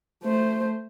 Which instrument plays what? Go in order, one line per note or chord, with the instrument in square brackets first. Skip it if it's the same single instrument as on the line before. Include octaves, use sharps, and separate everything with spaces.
[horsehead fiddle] A3 C5